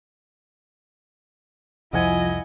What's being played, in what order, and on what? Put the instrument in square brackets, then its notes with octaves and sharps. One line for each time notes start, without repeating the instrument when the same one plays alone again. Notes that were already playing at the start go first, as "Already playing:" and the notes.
[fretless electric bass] C2 F2 [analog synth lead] F3 [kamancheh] E4 D#5 [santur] F5 F#5 G#5